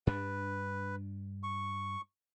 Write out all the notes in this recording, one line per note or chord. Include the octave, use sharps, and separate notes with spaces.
G2 D4 B4
C#6